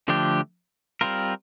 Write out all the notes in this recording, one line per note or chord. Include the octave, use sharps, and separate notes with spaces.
D3 F3 A3 D4 G4
G3 C4 F4 A#4